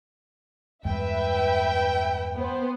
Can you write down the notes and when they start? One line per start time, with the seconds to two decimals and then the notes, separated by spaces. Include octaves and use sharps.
0.85 E2 G2 G#3 B4 E5 G5
2.36 B3 C5